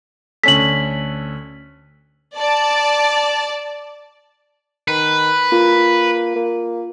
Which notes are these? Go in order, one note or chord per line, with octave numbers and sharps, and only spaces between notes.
D2 C#4 A4 B6 F#7
D5 A5
D#3 B4
A#3 F4
A#3